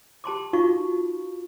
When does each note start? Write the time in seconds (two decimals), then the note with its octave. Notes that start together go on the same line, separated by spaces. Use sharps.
0.24 G4 A5 C6 D6
0.53 D#4 F4 F#4 F5 C#6